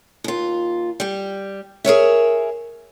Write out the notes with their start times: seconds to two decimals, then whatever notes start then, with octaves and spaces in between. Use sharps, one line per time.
0.24 D#2 F4
1.00 G3 G4
1.84 G#4 A#4 C#5 E5